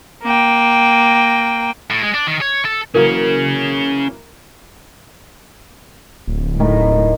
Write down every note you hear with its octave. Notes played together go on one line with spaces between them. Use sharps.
A#3 G5
A2
G#3
D4
D#3
C#5
A4
E3 F#3 A#3 C#4 G#4 A#4
D1
A2 D#3